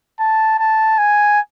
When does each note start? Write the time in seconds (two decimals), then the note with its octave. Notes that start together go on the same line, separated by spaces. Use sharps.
0.19 A5
0.59 A5
0.98 G#5